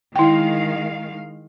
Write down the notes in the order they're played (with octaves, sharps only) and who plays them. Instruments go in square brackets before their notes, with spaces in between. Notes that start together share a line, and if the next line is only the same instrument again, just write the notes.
[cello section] D#3 G#3 F5 [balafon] E4 G5